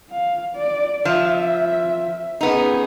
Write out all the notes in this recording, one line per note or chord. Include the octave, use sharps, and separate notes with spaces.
F5
D5
F3 E5
B3 C#4 D#4 G#4